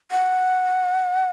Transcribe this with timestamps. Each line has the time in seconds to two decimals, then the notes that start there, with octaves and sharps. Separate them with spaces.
0.11 F#5